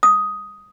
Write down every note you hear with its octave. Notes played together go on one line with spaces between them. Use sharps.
D#6